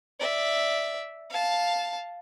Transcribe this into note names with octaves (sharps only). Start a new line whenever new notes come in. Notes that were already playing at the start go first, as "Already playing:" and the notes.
D5 E5
F5 A5